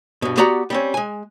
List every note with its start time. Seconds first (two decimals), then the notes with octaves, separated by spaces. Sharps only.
0.22 G2 B2
0.37 B3 F#4 G4 D5 F#5 A#5
0.70 G3 C4 C#4
0.94 G#3 G#5